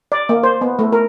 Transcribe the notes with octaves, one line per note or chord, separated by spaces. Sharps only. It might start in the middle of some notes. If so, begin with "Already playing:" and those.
D5
A#3
C5
B3
A3
A#4